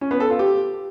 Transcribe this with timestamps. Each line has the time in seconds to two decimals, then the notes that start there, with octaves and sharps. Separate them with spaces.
0.01 C#4
0.11 B3
0.20 A4
0.30 F4
0.39 G4